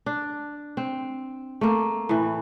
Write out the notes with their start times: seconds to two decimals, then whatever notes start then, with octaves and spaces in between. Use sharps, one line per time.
0.06 D4
0.77 C4
1.61 A3 A#3
2.09 A2 E3